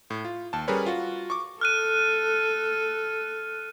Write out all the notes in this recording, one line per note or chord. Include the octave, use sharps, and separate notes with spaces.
A2
F4
D#2 A5
G3 C#4 G#4 A#4 B4 C#5
F4 F#4
C#6 D6
A4 F6 F#6 D#7